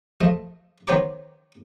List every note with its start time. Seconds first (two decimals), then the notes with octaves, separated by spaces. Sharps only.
0.21 F3 A3 D#5
0.87 D#3 B3 C5 C#5 A#5 D6